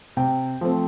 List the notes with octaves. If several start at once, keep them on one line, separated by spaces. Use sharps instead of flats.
C3 G5
F3 A3 C4